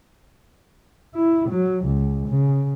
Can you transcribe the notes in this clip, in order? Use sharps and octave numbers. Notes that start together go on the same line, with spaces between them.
E4
F#3
C#2
C#3